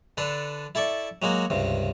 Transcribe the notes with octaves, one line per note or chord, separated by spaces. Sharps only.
D3 D4 A4 B4
E4 A4 D5 C#6
F#3 G#3 A#3 F#4
C#2 G2 C3